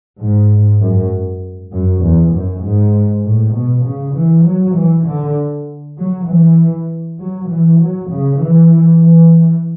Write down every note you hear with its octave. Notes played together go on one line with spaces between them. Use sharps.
G#2
F#2
F#2
E2
F#2
G#2
A2
B2
C#3
E3
F#3
E3
D3
F#3
E3
F#3
E3
F#3
C#3
E3
E3